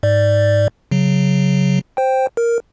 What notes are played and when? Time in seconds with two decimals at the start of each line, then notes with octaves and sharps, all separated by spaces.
0.03 G#2 D5
0.91 C#3 F#3
1.97 C5 G5
2.37 A#4